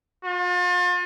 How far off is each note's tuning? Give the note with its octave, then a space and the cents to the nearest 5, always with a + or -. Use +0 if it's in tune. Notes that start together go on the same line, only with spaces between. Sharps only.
F4 +40